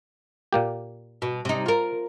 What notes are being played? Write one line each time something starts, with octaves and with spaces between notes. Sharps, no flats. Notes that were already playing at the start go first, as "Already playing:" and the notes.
A#2 A#3 G4
B2
C3 D#4
F4 A#4